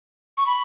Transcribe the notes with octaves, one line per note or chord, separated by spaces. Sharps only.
C#6
B5